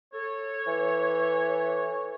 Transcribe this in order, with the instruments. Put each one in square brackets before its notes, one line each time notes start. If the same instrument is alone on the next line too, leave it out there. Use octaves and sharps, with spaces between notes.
[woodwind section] A4 C#5
[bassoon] E3